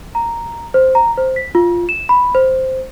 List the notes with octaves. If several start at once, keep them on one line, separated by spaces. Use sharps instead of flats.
A#5
C5
A#5
C5
B6
F4
E7
B5
C5